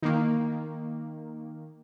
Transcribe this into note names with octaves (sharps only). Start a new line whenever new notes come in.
D#3 A#3